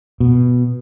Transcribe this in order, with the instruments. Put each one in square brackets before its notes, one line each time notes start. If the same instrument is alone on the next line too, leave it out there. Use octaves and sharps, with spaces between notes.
[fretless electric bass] B2